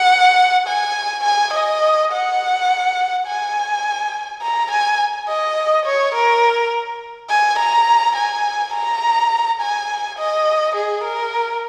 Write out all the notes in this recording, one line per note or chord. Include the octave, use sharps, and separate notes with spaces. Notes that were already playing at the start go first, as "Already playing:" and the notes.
Already playing: F#5
G#5
G#5
D#5
F#5
G#5
A#5
G#5
D#5
C#5
A#4
G#5
A#5
G#5
A#5
G#5
D#5
G#4
A#4